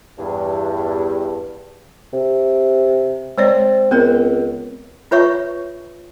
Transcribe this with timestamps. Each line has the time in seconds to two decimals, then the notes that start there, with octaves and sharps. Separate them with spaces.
0.19 E2 G2
2.13 C3
3.38 G#3 C4 C#5 D5
3.91 C#2 B3 C4 A#4
5.11 F4 B4 C#5 E5 C#6